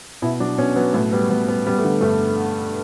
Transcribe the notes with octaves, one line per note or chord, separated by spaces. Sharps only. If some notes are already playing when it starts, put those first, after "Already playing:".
B2 E4
F#3 D4
B2 C#4
F#3 B3
A2 B3
G3 B3
A2 B3
G3 B3
G3 B3
A3
D3
G2 A3